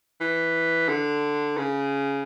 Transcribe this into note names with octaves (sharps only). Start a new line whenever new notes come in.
E3
D3
C#3